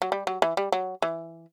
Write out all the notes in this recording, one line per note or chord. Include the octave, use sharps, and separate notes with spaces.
F#3
G3
F#3
E3
G3
F#3
E3